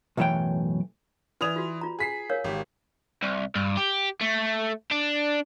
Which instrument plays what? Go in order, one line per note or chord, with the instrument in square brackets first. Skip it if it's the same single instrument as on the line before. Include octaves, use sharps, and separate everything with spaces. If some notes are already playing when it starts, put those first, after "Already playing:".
[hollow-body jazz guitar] B1 F#2 A2 E3 C#5 G5
[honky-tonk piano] E3 D#6 F7 [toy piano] B4 D5
[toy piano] F4 F#4
F4 A#5
[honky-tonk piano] G#4 B6 C7
[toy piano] A#4 C#5 F5
[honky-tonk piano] G#1 G4
[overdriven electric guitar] C2
G2
G4
A3
D4